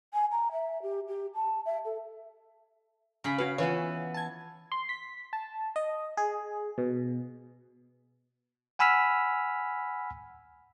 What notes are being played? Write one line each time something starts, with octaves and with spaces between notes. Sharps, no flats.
G#5
A#5
E5
G4
G4
A5
E5
A4
C#3 G#4 B5
C#4 F#4 B4 F5
E3 B3 F4 B4 C#5
A5 G#6
C6
B6
A5
D#5
G#4
B2
F#5 G#5 B5 E6 F6 B6